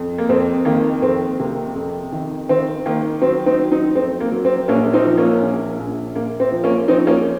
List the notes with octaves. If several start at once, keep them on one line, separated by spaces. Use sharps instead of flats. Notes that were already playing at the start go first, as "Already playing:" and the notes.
Already playing: F2
A#3
F2 C4
D#3 A#3
F2 C4
C3 A#3
F2
D#3
D#3 C4
D#3 A#3
F#3 C4
C4 D#4
F#3
C4 D#4
F2 C4
A#3
F#3
C4
A#1 A#3 C#4
C4 D#4
F3
A#3 C#4
A#1
A#1
A#1 A#3
C4
F3
A#3 C#4
F3 C4 D#4
A#3 C#4